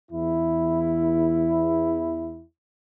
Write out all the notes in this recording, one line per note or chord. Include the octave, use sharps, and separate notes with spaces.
E2 E4